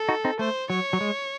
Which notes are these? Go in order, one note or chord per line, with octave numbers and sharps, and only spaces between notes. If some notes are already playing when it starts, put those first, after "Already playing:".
Already playing: A4
D#4 F#4
C4 D#4
A3 C5
F#3 C#5
F#3
G#3